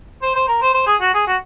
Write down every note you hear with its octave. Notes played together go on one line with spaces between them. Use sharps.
C5
C5
A#4
C5
C5
G#4
F#4
G#4
F#4